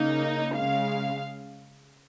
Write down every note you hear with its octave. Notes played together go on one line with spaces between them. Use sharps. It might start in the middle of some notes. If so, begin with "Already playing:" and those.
Already playing: C#3 A#3 D#4
C#3 G#3 F5